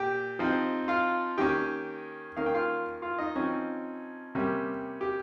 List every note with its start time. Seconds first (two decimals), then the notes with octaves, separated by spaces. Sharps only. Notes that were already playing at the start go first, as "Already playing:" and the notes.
Already playing: A#2 G4 G5
0.39 F3 C4 D#4
0.88 F4 F5
1.38 D#3 A#3 C#4 G4 G5
2.36 D#3 A#3 C#4 F5
2.46 G5
2.54 F4 F5
3.02 F4 F5
3.19 D#4 D#5
3.36 F3 C4 C#4 D#4 C#5
4.35 C3 G3 A#3 C#4
5.01 G4